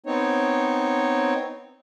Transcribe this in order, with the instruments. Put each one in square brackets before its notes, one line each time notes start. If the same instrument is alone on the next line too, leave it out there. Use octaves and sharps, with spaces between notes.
[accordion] B3 C4 D#4 C#5